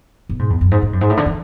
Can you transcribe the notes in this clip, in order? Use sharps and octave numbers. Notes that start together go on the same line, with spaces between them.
B2
G#2
E2
F#2
G#2
G#2
F#2
G#2
A2
D3
E3